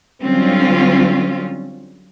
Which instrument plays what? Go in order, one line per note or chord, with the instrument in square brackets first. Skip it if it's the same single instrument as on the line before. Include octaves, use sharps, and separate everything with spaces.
[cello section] D3 F#3 G3 C4 C#4 F4